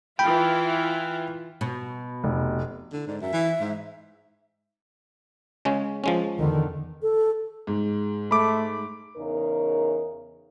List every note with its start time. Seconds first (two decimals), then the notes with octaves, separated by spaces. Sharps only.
0.19 E3 E4 F4 G5 B5
1.61 B2
2.24 F1
2.93 D3 E4
3.07 G#2 D5
3.21 F#2 E5
3.33 E3
3.61 G#2
5.65 C#3 G#3 C#4
6.04 F3 G#3 C#4
6.39 E2 D3 D#3
7.02 A4
7.67 G#2
8.31 A3 B5 D6
9.17 E2 C#3 D#4 A#4